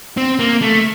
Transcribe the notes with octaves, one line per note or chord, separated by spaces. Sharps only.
C4
A#3
A3